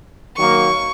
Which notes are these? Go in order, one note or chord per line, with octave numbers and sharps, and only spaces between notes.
D#3 F#3 A#3 C#6